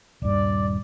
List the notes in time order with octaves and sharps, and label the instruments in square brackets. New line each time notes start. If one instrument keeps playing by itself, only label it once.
[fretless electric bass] D#1 G2 [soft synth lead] D5